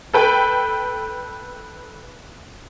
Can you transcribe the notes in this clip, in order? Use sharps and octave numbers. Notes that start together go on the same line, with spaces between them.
A4 B4 G5 B5